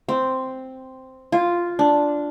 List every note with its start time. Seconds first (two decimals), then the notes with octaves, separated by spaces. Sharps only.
0.09 C4
1.32 F4
1.79 D4